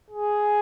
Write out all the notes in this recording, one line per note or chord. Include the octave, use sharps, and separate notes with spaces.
G#4